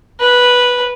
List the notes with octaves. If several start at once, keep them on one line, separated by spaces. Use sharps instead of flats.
B4